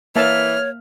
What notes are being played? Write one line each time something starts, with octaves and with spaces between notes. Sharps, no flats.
E3 A#3 C#5 E5 A5 F6